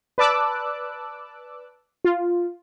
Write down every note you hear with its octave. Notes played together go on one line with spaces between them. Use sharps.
B4 D5 A5 D6 E6 F#6
F4